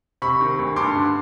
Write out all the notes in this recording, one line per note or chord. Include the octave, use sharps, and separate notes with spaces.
C3 B5 C#6
D#3
D2
G2 C6 D6
D3